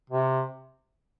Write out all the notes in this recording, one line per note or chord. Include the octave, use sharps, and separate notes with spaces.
C3